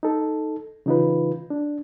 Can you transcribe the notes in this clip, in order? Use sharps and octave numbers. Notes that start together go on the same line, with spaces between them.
D#4 A4
C#3 E3 D#4 F4 B4
D4